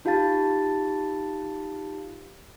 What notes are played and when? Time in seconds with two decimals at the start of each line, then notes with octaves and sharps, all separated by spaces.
0.05 D#4 F4 G4 F5 A5 A6